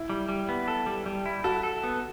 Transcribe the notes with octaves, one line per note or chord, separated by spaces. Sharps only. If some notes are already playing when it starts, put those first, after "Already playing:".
Already playing: E4
G3
G3
B3
A4
G3
G3
E4
F#4 A4
A4
B3